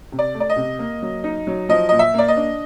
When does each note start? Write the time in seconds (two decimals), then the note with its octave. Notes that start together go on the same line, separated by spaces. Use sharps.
0.12 C3
0.19 D5
0.34 A3
0.40 D5
0.50 D#5
0.56 C3
0.79 A#3
1.02 F#3
1.24 D#4
1.47 F#3
1.69 F3 D#5
1.89 A#2 D#5
1.99 E5
2.14 A#3 D5
2.28 D#5
2.36 D4